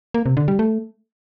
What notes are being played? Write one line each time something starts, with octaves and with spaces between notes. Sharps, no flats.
A#3
C3
D3
G3
A3